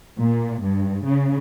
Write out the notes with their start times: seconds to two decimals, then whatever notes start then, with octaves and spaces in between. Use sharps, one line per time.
0.19 A#2
0.62 G2
1.05 C#3